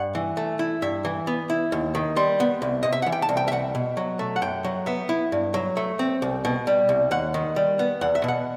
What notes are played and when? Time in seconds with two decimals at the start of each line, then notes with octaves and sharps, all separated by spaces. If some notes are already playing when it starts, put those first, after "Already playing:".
Already playing: G2 F#5
0.15 E3
0.37 A3
0.59 E4
0.82 G2 E5
1.05 E3
1.27 B3
1.50 E4
1.72 D#2
1.95 D#3
2.16 G3 C6
2.40 B3
2.62 C2
2.83 C3 D#5
2.93 E5
3.02 E3 F#5
3.12 G5
3.22 A5
3.29 C2
3.37 G5
3.48 E5
3.52 C2 F#5
3.75 B2
3.97 F#3
4.19 A3
4.36 F#5
4.42 F#2 G5
4.64 F#3
4.86 B3 E5
5.09 E4
5.32 G2
5.54 F#3
5.77 A3
5.99 C4
6.22 C2
6.45 B2
6.67 G3
6.89 C2
7.11 D#2 F#5
7.34 D#3
7.56 G3
7.79 B3
8.01 E2 F#5
8.15 E5
8.24 B2 F#5